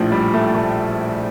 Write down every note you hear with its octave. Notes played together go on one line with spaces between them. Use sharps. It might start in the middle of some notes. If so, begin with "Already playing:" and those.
Already playing: A#1 A2 F3
G3
A3
A3